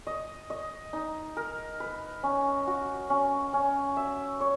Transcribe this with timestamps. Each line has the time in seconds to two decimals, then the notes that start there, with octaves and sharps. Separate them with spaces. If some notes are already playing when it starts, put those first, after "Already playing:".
0.07 D#5
0.50 D#5
0.93 D#4
1.37 A#4
1.80 B4
2.23 C#4
2.67 F#4
3.10 C#4
3.54 C#4
3.97 E5
4.40 C#5